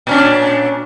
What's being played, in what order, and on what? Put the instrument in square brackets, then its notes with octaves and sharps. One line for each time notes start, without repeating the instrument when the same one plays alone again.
[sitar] A#2 C#4 D4